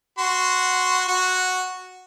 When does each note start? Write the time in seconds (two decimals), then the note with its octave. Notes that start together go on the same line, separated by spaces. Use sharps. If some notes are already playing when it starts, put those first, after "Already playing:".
0.18 F#4 C6
1.08 F#4